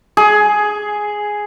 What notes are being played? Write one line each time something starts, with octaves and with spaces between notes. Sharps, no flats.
G#4